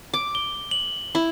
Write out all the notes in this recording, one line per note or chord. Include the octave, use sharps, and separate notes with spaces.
D6
G7
F#7
E4